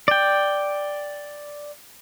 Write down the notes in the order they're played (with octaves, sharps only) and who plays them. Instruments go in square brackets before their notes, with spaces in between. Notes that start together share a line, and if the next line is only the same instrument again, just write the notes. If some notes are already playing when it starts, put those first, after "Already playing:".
[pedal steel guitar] D5 G5